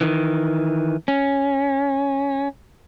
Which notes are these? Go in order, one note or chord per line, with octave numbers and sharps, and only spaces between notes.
D#3 E3
C#4